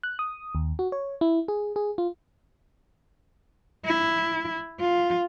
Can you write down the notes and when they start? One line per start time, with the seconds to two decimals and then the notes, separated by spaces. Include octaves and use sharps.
0.03 F#6
0.19 D#6
0.55 D#2
0.79 F#4
0.92 C#5
1.21 E4
1.48 G#4
1.76 G#4
1.98 F4
3.85 E4
4.80 F4